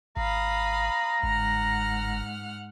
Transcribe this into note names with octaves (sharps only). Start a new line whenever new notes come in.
G#1 F5 A#5 B5 D#6
G1 G#2 F#5 F6